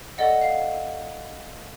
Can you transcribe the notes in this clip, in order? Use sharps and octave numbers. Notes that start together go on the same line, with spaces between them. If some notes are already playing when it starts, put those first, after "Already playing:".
A4 D5 D#5 F#5
F5